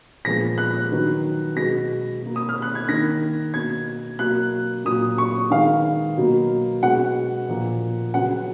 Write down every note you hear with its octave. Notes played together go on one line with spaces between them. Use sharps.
A#2 F3 G#3 B3 A#6
F#6
D#3 F#3 B3
B2 G#3 B3 A#6
B2 A#3
D#6
F6
F#6
G#6
D#3 A#3 A#6
B2 A#3 G#6
B2 F#3 A#3 F#6
A#2 F#3 A#3 D#6
C#6
D#3 G#3 B3 F5
B2 F#3 A#3
B2 G#3 B3 F#5
A#2 F3 A#3
C#3 F#3 B3 F#5